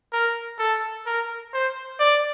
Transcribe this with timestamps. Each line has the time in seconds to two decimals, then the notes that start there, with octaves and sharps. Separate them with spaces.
0.13 A#4
0.59 A4
1.06 A#4
1.54 C5
2.00 D5